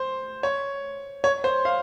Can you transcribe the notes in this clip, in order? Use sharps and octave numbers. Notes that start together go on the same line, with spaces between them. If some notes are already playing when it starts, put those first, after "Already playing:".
Already playing: C5
C#5
C#5
C5
F5